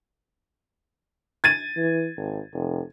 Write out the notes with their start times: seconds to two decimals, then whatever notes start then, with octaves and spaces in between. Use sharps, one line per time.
1.44 G#6 A6 D#7
1.76 E3
2.17 G#1
2.53 F1